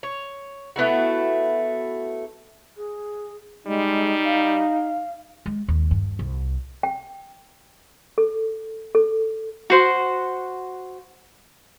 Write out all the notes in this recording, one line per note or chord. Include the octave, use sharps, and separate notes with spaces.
C#5
A3 B3 E4 F#4
G#4
G3 G#3 D#4
F5
G#3
D#2
G2
C2
G5
A4
A4
F#4 C5 F#5